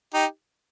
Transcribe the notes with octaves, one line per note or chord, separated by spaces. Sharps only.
D#4 G4